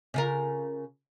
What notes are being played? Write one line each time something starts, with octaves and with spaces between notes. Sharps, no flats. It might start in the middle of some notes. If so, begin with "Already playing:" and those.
C#3 F4 A#4